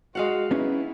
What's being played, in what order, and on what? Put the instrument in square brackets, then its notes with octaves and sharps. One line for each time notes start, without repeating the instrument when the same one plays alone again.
[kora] G#3 F5 F#5 [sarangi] F#4
[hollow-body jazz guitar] B3 C#4 D#4 [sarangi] E4